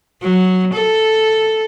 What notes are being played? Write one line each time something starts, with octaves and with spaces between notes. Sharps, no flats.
F#3
A4